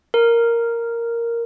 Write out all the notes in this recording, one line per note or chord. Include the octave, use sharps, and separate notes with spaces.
A#4